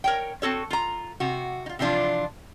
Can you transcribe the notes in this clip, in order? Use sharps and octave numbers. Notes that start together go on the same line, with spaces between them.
A#4 C#5 G5
C4 F#4 A4 C#5
F4 A#5
C3 F#4
D#4 F4
C3 E3 F3 D4 F4